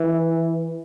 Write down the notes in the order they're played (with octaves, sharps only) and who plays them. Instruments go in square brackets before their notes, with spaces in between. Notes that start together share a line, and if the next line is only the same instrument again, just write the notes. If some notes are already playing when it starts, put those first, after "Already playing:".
Already playing: [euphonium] E3